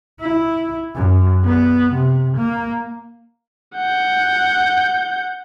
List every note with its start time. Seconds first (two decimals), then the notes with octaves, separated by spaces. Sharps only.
0.21 E4
0.95 F#2
1.44 B3
1.93 C3
2.37 A#3
3.76 F#5 G6